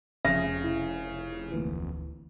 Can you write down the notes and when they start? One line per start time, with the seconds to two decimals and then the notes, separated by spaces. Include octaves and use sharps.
0.25 F1 F2 C#3 E5 D#6
0.64 E4
1.52 D2 A#2 E3